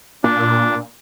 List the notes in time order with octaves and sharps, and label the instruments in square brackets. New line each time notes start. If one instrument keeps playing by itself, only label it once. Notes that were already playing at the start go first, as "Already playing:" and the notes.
[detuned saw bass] A#2 [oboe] D4